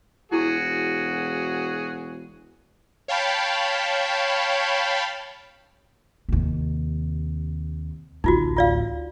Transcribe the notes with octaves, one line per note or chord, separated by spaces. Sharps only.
E1 E4 F#4 G#4 C#6
C#5 F5 G5 A5 B5
D#2 C3
D1 A1 D#4 F4 F#4
F4 D5 F5